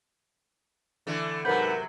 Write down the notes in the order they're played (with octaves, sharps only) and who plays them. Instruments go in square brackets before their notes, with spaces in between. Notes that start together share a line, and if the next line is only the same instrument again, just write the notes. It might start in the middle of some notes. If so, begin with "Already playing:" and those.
[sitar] D3 E3 A3
[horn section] G#2 B4 F#5 [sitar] C3 F#3 [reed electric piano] A#4 G6